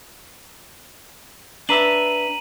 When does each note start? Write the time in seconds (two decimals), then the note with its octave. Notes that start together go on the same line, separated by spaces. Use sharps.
1.69 D4 B4 E5 A#5 D#7 F#7